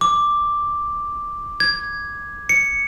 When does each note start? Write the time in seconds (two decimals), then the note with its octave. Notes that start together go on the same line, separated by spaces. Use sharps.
0.01 D6
1.60 G#6
2.49 C#7